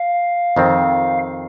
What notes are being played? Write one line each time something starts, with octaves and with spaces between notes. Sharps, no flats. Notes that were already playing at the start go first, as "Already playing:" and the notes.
Already playing: F5
F2 D#3 C4